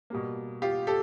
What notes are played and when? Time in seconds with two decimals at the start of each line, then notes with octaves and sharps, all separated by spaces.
0.10 B2 G3 A#3
0.62 F4 G4
0.87 G4 A4